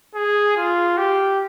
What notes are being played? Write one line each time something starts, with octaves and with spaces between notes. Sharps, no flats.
G#4
F4
G4